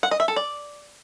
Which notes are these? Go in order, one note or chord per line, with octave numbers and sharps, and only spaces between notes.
F#5
D#5
E5
A4
D5